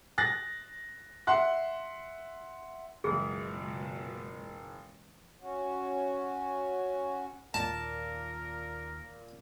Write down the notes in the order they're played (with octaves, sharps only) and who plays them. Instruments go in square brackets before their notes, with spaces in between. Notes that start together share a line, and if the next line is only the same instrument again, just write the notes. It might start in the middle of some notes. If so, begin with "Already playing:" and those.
[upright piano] F#6 A6 A#6
E5 F#5 C6 F#6
[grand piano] F#1 [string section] C#2 B2 [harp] E3 D#6 C7 [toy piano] G#4
[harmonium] C#4 F#4
[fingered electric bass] D#2 D#3 [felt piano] A#2 [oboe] A#4 [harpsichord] A5